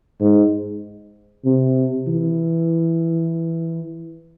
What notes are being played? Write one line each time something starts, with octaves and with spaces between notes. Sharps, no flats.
G#2
C3
E3